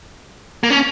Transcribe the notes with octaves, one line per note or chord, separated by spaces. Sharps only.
A#3
C#4